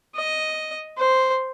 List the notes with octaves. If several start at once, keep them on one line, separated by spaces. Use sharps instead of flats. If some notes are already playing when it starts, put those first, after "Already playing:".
D#5
C5